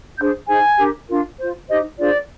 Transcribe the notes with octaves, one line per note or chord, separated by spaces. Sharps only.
D4 G#4 C5 G6
D#4 G#4 C5 G#5
D4 G4 A#4
D4 F4 A#4
F4 C5
D#4 G4 C5 D#5
D4 F4 G#4 C5 D5